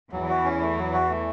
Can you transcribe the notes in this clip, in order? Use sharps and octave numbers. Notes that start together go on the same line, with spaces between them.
E2 E3 F#3
F#4
C#4
A3
F#3
F#4
A3